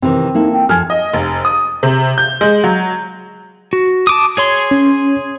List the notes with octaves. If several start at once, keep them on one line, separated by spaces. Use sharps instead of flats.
C3 D#3 E3 C4
A#3 D#4 E4 A4
G5
F2 F3 A4 G#5 F6 G#6
D#5
F1
D#6
C3
G6
G#3
F#3
F#4
A5 D6 D#6
G#4 C#5 C6
C#4